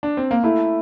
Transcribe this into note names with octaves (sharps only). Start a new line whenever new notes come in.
D4
C4
A#3
A3 E4